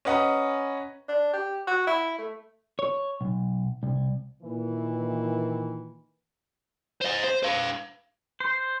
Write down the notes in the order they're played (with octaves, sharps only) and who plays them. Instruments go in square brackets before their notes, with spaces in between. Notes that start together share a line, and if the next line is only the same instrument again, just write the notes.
[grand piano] C#4 B4 D#5 F#5 A#5
[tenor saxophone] D4
G4
F#4
E4
A3
[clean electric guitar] C#5
B1
C2
[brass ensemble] A#2 D#3 E3
[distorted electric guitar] C5 D#5
C5
B4 F5
[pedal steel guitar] C5